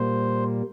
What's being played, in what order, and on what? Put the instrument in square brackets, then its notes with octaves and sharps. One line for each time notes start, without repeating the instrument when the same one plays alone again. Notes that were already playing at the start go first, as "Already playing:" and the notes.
Already playing: [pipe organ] A#2 G3 A#3 C5